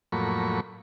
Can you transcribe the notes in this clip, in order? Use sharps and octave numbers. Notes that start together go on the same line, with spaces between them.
F2 A2 F#3 A#3 B5 C#6